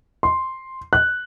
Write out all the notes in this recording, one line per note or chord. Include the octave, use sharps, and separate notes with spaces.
C6
F#6